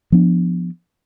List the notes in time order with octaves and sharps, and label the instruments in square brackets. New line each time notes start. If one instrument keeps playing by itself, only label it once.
[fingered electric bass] F3 B3 D4